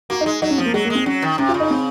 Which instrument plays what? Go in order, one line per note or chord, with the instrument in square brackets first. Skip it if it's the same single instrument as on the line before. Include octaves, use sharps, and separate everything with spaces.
[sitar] A#3 [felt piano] F#4
[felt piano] D#4
[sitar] G#3
[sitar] F#3 [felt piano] D#4
[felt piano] C#4
[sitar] F3 [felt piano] C4
[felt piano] A#3
[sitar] F#3 [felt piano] G#3
[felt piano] A#3
[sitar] G#3
[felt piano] C4
[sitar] F#3 [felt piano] C#4
[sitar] D#3
[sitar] C3 [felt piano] C#4
[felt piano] F4
[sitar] C#3
[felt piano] D#4
C4